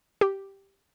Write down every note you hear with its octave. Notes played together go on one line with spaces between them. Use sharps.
G4